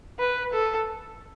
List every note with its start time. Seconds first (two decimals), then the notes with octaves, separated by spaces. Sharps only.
0.19 B4
0.53 A4